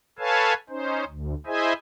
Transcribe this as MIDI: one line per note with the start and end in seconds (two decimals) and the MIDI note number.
0.19 0.54 69
0.19 0.54 71
0.19 0.54 73
0.19 0.54 77
0.19 0.54 80
0.19 0.54 81
0.69 1.04 61
0.69 1.04 63
0.69 1.04 72
1.06 1.34 38
1.46 1.73 64
1.46 1.73 68
1.46 1.73 72
1.46 1.73 75
1.46 1.73 76
1.46 1.73 80